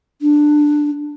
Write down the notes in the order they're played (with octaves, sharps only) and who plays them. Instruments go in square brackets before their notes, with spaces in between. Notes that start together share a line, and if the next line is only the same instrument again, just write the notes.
[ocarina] D4